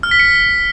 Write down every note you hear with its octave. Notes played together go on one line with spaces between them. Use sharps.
F6
B6
C#7